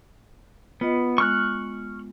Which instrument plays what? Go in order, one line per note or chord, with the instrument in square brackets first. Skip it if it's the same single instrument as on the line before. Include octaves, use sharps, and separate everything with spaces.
[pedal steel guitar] B3 [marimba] F4 D#5
[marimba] G#3 B3 [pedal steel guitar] C#6 F6 F#6